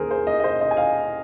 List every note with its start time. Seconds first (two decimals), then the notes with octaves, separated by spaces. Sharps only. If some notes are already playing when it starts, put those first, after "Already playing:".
Already playing: D#2 D#3 G#3 G#4 A#4 C5
0.11 C5
0.27 D#5
0.40 D#5
0.44 C5
0.61 D#5
0.71 G#5
0.77 F5